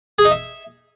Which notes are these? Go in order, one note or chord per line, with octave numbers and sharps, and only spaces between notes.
G#4
D#4
E5